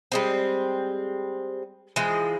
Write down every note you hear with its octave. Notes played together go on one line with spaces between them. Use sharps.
G3 G#3 C4
E3 F3 G#3